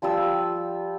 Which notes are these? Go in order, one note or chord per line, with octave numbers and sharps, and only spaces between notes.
F3 G3 F4 E6